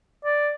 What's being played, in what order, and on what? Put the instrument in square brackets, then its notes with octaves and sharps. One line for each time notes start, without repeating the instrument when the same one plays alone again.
[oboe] D5